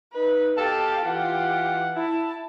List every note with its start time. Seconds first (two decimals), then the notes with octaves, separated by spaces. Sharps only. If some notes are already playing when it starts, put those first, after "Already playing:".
0.12 D#4 B4
0.55 B2 G4 A4 F5 A5
1.04 E3 F4 G4 F#5
1.96 E4 A5